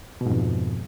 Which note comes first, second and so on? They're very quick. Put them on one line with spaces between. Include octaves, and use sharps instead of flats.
B2 G#2 F2